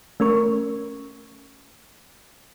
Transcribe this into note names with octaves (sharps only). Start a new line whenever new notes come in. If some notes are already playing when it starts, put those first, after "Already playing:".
A3 C#4 A#4 C#6